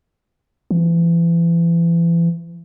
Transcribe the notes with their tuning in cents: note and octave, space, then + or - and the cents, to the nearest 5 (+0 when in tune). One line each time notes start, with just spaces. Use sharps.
E3 +35